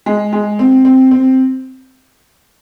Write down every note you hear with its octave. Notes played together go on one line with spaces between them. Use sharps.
G#3
G#3
C4
C4
C4